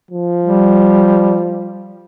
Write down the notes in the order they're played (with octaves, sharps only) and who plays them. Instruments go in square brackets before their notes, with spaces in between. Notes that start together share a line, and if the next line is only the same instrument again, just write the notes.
[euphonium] F3
[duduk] G3